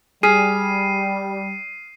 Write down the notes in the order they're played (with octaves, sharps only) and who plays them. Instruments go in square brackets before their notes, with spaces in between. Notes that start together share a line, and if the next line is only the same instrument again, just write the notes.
[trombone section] G3 [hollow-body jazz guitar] G#4 [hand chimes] D#6 F6 B6 [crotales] C7 D#7